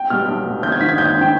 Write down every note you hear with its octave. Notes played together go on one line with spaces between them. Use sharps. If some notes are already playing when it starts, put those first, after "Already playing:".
Already playing: G5
B2 G3 F6
B1
B2 G3
G#1 G6
G#6
G#2 D#3 B6
G#6
G#1 G6
D#3 G5